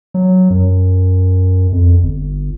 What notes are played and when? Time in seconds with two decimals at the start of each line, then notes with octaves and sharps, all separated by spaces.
0.14 F#3
0.50 F#2
1.72 F2
2.02 G1